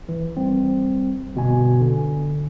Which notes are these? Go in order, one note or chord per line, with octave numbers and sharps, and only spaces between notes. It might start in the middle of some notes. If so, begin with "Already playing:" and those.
E3
G3 C4
G1 B2 G#5
D3